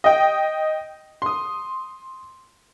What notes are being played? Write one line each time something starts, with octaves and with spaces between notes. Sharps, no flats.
D#5 G5
C6 D#6